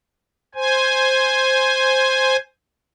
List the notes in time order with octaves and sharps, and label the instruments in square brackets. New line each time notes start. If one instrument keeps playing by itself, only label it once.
[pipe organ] C5 G#5